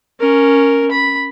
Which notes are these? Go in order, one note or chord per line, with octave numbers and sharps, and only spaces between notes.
C#4 A#4
B5